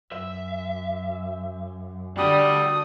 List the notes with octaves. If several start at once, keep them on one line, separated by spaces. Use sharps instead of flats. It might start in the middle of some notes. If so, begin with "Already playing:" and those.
F#2 E5
D3 G3 D4 F#4 D5 D#6